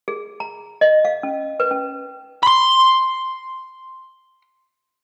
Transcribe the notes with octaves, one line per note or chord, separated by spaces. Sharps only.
G#4
A#5
D#5
F5
C#4
B4
C#4
B5 C6